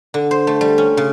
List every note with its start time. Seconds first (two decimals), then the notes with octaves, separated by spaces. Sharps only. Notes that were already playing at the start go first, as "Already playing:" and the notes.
0.14 D3
0.31 C5
0.47 A3
0.61 G3
0.78 C#4
0.97 C#3